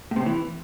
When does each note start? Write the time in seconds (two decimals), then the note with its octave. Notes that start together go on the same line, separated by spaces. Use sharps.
0.11 A2
0.16 C3
0.21 A2
0.26 E3